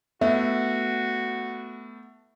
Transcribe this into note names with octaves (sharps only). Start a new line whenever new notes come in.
A3 B3 F#4 E5